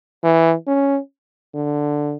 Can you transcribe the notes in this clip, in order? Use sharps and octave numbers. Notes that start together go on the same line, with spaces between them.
E3
C#4
D3